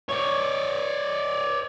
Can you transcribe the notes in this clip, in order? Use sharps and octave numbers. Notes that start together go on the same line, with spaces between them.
C#5 D5